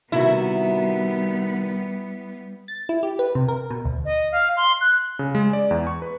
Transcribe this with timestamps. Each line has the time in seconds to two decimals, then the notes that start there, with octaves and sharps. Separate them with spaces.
0.12 C3 D#3 G3 B3 E4 F#4
2.68 A6
2.89 E4
3.03 G4
3.19 B4
3.35 C3
3.48 A#4
3.70 B2
3.85 D2
4.05 D#5
4.32 F5
4.57 C6
4.81 F#6
5.19 C#3
5.35 G#3
5.53 D5
5.71 E2
5.87 C#6
6.02 B4